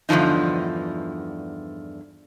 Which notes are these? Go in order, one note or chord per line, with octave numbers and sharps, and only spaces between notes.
E2 G2 D3 F3 D#4